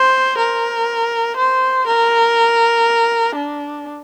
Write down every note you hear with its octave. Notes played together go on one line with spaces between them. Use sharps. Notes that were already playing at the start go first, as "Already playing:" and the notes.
Already playing: C5
A#4
C5
A#4
D4